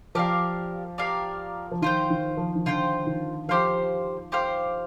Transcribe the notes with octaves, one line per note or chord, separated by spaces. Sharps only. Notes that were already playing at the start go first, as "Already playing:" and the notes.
F3 G4 A#4 D5 F5
G4 A#4 D5 F5
F3
D#3 F4 C5 G5
D#3
F3
D#3
D3 F4 C5 G5
D#3
F3 G4 C5 F5
G4 C5 F5